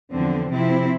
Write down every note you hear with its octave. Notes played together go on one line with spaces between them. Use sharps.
E2 D3 F3 C4
C3 F3 C4 E4